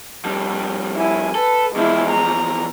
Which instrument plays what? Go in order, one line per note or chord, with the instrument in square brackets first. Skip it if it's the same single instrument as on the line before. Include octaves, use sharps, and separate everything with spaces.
[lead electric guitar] F2 G3
[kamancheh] E4 G#5
[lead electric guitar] A4 [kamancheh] B4
[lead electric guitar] E2 F3 [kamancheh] G#3 E4
[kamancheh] A#5